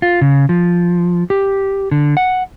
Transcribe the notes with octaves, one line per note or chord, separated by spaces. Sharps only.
F4
C#3
F3
G4
D3
F#5